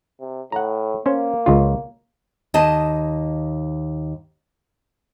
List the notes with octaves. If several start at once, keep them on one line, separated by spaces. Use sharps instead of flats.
C3
A2 F#5 A#5
A#3 C#4 C5
C#2 C#3 F4
D#2 D#5 A5